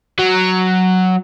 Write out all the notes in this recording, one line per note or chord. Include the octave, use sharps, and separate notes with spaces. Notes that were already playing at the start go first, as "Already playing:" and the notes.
F#3